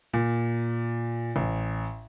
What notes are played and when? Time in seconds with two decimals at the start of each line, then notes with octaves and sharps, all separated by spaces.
0.13 A#2
1.36 A1